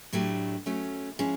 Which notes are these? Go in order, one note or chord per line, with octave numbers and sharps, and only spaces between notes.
A2 F#3 A3 D4 G4
F#3 A3 C#4
F3 G#3 C#4 E4 G#4